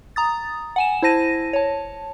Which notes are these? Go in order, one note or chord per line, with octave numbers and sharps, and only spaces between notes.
A#5 D#6 A6
F#5 G#5 E7
E4 C5 A5 A#6 D#7
C#5 A5